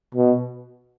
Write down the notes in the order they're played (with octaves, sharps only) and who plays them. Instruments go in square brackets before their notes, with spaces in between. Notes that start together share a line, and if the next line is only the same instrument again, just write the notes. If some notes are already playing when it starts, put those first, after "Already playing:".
[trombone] B2